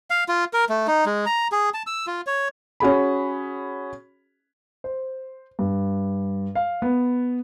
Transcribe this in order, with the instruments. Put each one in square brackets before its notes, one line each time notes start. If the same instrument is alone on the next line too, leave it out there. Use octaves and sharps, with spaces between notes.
[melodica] F5
F4
A#4
A3
D#4
G#3
A#5
G#4
A5
E6
F4
C#5
[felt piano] C#4 F#4 G#4 B5
[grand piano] C5
G2
F5
B3